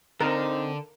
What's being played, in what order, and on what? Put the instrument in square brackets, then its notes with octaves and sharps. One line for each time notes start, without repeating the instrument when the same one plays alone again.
[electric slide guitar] D3 [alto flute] C4 [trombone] D#4 [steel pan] A#4